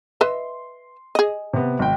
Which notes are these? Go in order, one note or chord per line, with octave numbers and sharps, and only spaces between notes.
B4 D#5 E5 C6
G#4 D#5
C3 B3
G#1 G5